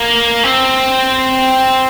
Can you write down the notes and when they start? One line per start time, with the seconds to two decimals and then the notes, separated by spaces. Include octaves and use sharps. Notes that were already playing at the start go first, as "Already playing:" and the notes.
Already playing: A#3
0.43 C4